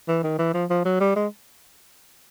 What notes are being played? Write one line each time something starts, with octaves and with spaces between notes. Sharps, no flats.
E3
D#3
E3
F3
F3
F#3
G3
G#3